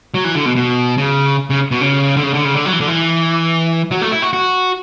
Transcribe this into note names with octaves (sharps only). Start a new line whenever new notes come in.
F#3
E3
D3
B2
B2
C#3
C#3
B2
C#3
D3
C#3
D3
C#3
D3
F#3
E3
D3
E3
F#3
A3
E4
F#4
F#4